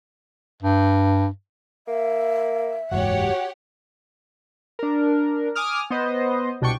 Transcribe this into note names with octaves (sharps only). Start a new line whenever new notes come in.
G2
A#3 E5
F#1 E2 G#2 F#4 G4 C#5 F#5
D4 A#4
G#5 D6 D#6 F6
B3 C5 D#5
C2 B2 D4 G5 C#6